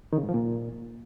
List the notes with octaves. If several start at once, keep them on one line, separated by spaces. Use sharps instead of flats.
D#3
C#3
G#2
F3
A#2